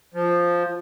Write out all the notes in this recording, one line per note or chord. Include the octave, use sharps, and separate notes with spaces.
F3